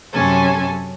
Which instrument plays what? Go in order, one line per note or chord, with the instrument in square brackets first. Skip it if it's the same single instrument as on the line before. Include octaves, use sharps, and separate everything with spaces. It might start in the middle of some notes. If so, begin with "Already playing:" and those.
[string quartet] F#2 C3 C#4 A4 G#5